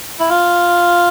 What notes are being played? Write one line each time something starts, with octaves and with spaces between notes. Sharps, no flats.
E4
F4